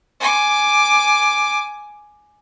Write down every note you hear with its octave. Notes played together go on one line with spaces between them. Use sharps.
G#5 D6